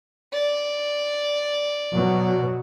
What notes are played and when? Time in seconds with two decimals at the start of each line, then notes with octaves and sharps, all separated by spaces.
0.33 D5
1.94 B2 F#3